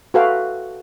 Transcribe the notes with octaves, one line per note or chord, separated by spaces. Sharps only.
F#4 A4 B4 E5 F5 G5